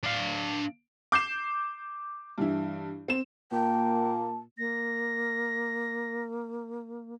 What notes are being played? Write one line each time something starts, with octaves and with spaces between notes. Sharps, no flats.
D4 F5
D6 G6 C7 E7
G2 E3 E4
C4 E7
A#2 A#3 G5 A5
A#3 A#6